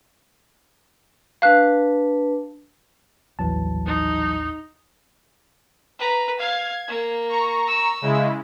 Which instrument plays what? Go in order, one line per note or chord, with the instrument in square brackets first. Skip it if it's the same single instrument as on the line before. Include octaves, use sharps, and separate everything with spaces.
[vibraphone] D4 B4 A5 [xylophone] F5 F#6
[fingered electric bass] D#1 A1 D#2 [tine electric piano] E3 F#3 A5
[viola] D#4
[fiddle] B4 A#5
[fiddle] F5 [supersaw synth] G#6
[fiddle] A#3
[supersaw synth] A#5 C#6
[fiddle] E6
[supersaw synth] C#3 G#3 E4